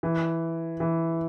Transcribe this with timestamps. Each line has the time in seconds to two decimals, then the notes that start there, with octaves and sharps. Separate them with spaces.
0.03 E3
0.80 E3